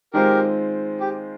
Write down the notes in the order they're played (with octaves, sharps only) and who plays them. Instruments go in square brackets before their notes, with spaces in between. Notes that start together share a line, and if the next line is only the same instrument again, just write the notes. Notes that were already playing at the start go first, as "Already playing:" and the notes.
[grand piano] D#3 G#3 C4 F4 C5 [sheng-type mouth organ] G4 A#4
[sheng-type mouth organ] G4